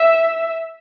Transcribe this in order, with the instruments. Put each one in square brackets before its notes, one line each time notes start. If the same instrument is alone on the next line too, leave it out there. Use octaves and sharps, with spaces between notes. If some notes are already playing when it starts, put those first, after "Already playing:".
Already playing: [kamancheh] E5